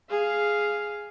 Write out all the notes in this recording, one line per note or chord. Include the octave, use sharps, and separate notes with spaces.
G#4 F5